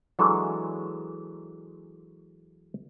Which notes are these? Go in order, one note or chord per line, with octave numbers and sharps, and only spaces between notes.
E3 F#3 G#3 D4 E4 A4